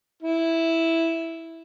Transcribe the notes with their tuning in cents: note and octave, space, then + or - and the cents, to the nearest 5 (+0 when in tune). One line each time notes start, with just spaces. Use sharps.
E4 -5